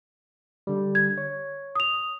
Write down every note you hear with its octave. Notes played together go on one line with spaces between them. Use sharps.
D3 G3
G#6
C#5
D#6 F7